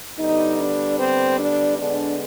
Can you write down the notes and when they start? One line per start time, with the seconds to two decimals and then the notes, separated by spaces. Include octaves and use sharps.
0.18 D3 G3 B3 D#4
0.59 D4
0.99 C4
1.39 D4
1.79 D3 G#3 B3 D4